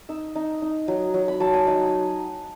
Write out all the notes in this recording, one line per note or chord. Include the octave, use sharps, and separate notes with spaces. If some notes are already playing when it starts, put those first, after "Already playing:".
D#4 E6
D#4
D#4
F#3
F#3
B5
F#3 A5
G#5
D#4 F#5